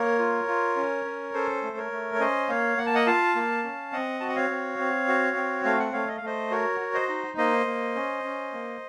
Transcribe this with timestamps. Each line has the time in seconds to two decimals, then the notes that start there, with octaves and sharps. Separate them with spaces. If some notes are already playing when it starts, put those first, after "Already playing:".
Already playing: A#3 A#4 C#5
0.19 F4
0.48 F4
0.76 C#4
1.05 C#4
1.34 C#4 A4 C5
1.63 A3
1.77 A#4 C#5
1.91 A3
2.15 C#5
2.20 C#4 C5 D#5
2.49 A#3 C#5 F5
2.78 A#3 F#5
2.86 A5
2.95 D#5 F#5
3.06 F4 F5 A5
3.35 A#3
3.64 C#4
3.93 C4 D#5 F#5
4.20 F#4 A5
4.28 F#5
4.36 C#5 F5
4.50 C4
4.79 C4
5.08 F#4
5.36 C4
5.65 A3 F5
5.79 F#5
5.93 A3 C#5 F5
6.08 D#5
6.17 F5
6.22 A3 C5 D#5
6.51 F#4 A#4 C#5
6.80 F#4
6.94 C5 D#5
7.09 D#4
7.38 A#3 C5 D#5
7.67 A#3
7.95 C#4
8.24 C#4
8.53 A#3